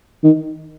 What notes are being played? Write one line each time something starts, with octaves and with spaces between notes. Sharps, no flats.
D#3